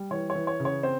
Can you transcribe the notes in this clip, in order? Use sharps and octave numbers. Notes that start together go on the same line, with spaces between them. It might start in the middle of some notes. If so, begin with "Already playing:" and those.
Already playing: G3
E3 C#5
C#5
E3
C#5
C#3
C#5
C4 C5